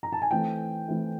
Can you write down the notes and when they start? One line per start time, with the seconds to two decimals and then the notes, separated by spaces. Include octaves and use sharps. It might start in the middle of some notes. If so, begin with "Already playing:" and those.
0.03 A#5
0.12 A5
0.22 G#5
0.31 E3 A3 C4 E4 G5
0.88 E3 A3 C4 E4